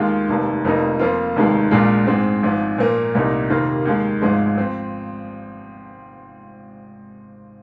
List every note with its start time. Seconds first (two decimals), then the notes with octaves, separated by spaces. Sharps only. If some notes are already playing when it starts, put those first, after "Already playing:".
Already playing: D#2 D#3 G#3 F4
0.28 F1 D#2 D#3
0.64 F1 F2 F3 A#3 D#4
0.99 F2 F3 A#3 F4
1.36 F1 D#2 D#3 G#3
1.71 A#1 A#2 G#3 F4
2.07 G#2 G#3 C4
2.43 G#1 G#2 F3
2.78 A#2 F3 A#3
3.15 C2 A#2 A#3 D#4
3.50 F2 C3 D#3 A#3 F4
3.85 D#2 D#3 G#3
4.22 G#1 G#2 F3 G#3
4.58 F3 C4